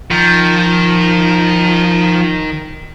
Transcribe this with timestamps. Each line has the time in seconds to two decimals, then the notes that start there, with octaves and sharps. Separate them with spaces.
0.11 D#3 F3